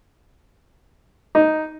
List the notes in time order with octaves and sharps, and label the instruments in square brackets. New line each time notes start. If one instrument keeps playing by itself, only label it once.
[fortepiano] D#4